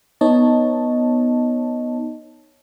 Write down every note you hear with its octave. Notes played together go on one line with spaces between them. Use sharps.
B3 D#4 C#5 D#5 A5